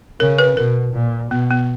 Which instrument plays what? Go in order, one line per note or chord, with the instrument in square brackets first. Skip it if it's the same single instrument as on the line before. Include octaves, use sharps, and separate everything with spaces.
[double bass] C#3 [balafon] A#4
[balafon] B4
[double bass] B2 [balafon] A#4
[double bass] A#2
[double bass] B2 [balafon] B3
[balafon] B3